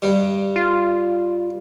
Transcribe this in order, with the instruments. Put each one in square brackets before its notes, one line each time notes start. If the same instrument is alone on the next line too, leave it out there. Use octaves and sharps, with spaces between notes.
[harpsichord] G2 G3
[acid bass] F4